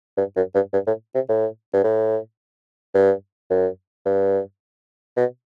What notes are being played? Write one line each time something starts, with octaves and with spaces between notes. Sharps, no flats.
G2
F#2
G2
G2
A2
C3
A2
G2
A2
G2
F#2
G2
B2